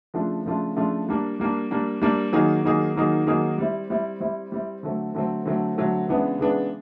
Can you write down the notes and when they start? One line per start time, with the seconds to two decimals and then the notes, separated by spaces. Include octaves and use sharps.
0.14 C#3 F3 A3 D4 F4
0.46 C#3 F3 A3 D4 F4
0.76 C#3 F3 A3 D4 F4
1.09 G3 A#3 D4
1.40 G3 A#3 D4
1.71 G3 A#3 D4
2.02 G3 A#3 D4
2.33 D#3 F#3 A#3 D#4 G#4
2.64 D#3 F#3 A#3 D#4 G#4
2.96 D#3 F#3 A#3 D#4 G#4
3.27 D#3 F#3 A#3 D#4 G#4
3.58 G3 C4 E4
3.90 G3 C4 E4
4.21 G3 C4 E4
4.52 G3 C4 E4
4.83 D3 F#3 A3 C4
5.14 D3 F#3 A3 C4
5.45 D3 F#3 A3 C4
5.78 D3 F#3 A3 C4
6.09 C#3 E3 G#3 B3 D4
6.39 C#3 E3 G#3 B3 D4